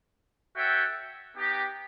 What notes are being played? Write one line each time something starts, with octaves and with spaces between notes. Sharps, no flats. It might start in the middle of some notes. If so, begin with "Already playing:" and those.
F#4 A4 C#5 E5 G5
B3 D#4 G4